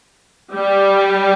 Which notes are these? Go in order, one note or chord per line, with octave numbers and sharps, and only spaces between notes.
G3